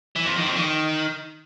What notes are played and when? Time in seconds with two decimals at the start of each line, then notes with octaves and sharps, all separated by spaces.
0.16 E3
0.26 F2
0.36 D#3
0.46 F2
0.56 D#3